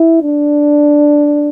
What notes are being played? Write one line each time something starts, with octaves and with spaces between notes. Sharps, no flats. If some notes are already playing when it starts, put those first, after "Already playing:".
Already playing: E4
D4